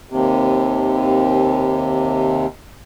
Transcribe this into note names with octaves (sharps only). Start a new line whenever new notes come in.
D#2 C3